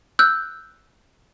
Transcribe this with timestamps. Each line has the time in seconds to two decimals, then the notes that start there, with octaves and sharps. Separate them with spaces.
0.19 E6 F#6 G6